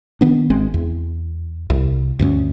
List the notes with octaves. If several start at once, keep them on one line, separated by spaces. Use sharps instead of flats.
D#3 B3 D4
G#1 G#3 C4
E2
C2
D2 G2 A#3 C#4